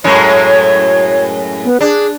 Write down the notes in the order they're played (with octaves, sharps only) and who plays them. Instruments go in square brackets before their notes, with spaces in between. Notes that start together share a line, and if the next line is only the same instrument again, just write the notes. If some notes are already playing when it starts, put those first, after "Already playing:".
[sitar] F#2 A2 G#3 [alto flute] C#5
[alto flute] B3
[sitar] D4 [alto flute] G#4